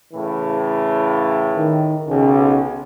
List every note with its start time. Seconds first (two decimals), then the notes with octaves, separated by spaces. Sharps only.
0.13 A2 C#3 E3
1.56 D#3
2.07 B1 C#3